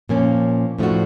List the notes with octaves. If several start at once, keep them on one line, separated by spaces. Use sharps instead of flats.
A#2 F3 A#3 C#4
A2 F3 A3 D4 F#4